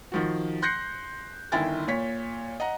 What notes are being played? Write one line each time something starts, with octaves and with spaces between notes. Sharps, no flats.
D#3 F3 F#4
C6 F#6 G6 A#6 C7 C#7
G1 D#3 E4 G5 G#5 A6
A#2 C#5 B6
D#5 F#5 A#5